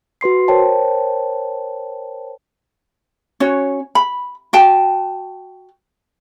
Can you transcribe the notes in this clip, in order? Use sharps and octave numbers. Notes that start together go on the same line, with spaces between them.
F#4 B4 C6 C7
A#4 C5 C#5 G5 A5
C#4 F#4 C#5
B5
F#4 G5 A5